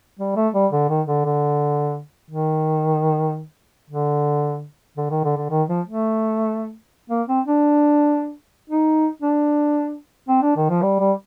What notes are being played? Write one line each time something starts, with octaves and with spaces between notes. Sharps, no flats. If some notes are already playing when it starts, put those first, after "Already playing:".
G3
A3
G3
D3
D#3
D3
D3
D#3
D3
D3
D#3
D3
D3
D#3
F3
A3
A#3
C4
D4
D#4
D4
C4
D4
D#3
F3
G3
G3